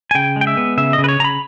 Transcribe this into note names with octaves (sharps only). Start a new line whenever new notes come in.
G#5
C#3 G5
G#3
G5
E5
B3
C#3 E5
D#5
C#3
B4
C#5
C#3 A#5
B5